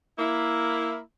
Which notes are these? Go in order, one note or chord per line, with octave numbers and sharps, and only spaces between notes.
A#3 E4